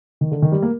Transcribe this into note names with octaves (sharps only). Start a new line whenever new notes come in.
D#3
D3
D#3
G3
A#3